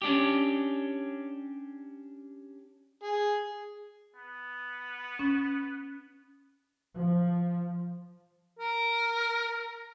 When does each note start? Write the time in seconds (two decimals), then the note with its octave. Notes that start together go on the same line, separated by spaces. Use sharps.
0.02 C#4 D4 G4
3.03 G#4
4.16 B3
5.19 C#4
6.93 F3
8.59 A#4